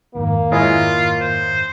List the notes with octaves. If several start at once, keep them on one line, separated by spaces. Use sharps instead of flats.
F2 G#2 D#3 A#3
G#3 E4 F4 C#5
C5